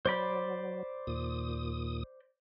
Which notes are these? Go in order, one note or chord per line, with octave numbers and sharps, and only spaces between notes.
F#3 C5 D5 B5
D#2 A#2 D#6